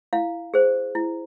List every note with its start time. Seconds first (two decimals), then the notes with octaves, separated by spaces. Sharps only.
0.13 E4 F5
0.54 G#4 C5
0.95 E4